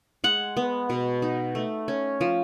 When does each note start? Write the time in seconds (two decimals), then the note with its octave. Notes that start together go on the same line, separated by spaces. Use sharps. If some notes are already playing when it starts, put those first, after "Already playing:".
0.24 G#3 F#5
0.57 B3
0.90 B2
1.22 D#4
1.55 A3
1.88 C#4
2.21 F3